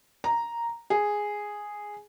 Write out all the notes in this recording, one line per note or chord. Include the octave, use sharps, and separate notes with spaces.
A#5
G#4